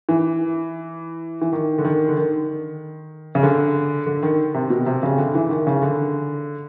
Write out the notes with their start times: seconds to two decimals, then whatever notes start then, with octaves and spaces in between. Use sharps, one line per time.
0.09 E3
1.41 E3
1.53 D#3
1.78 D3
1.85 D#3
2.09 D3
2.17 D#3
3.35 C#3
3.43 D3
4.06 D3
4.23 D#3
4.54 C3
4.70 B2
4.86 C3
5.03 C#3
5.18 D3
5.35 E3
5.50 D#3
5.67 C#3
5.82 D3